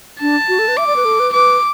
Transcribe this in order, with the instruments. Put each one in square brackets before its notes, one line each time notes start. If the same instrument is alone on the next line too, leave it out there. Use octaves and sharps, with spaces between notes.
[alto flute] D4 [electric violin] A5
[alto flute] F#4
A4
B4
[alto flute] E5 [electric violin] D6
[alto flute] D5
B4
A4
B4
[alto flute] B4 [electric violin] D6